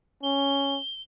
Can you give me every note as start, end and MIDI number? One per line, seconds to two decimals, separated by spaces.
0.23 0.79 61
0.23 1.02 103